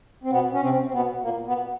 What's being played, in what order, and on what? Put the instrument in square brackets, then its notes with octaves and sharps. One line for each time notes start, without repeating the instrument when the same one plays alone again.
[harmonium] C4
B2 B3
C#4
C3 C4
C4
B2 B3
A#2 A#3
B2 B3